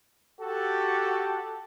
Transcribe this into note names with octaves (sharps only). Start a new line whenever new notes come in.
F#4 G4 A4